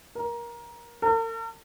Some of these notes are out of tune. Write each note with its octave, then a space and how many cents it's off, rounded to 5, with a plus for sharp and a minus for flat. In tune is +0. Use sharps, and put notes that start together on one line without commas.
A#4 +20
A#4 -45